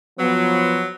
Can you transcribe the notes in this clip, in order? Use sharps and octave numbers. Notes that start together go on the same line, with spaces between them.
F3 F#3 B3